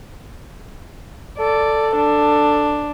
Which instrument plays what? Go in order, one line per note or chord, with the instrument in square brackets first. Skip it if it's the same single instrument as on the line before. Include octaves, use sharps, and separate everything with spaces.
[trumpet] A4 [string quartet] D5
[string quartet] D4